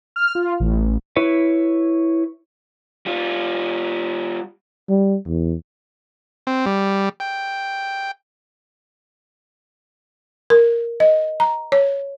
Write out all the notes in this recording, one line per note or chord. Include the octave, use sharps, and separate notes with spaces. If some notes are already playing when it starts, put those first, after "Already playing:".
F6
F4
A1
E4 B4 C#5
G3 F4
G3
E2
C4
G3
G5
A#4
D#5
A#5
C#5